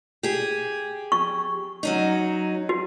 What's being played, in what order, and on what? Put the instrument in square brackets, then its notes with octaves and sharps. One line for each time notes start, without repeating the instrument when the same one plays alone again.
[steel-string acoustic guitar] G4 G#4
[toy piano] C#6
[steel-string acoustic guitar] F#3 C#4 D#4
[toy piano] F#4